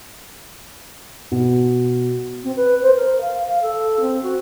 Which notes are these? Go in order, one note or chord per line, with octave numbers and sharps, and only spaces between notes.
B2
C4
B4
C5
A#4
F5
F5
A4
C4
F#4